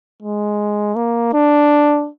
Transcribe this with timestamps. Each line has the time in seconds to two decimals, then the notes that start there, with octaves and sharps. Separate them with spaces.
0.22 G#3
0.95 A#3
1.33 D4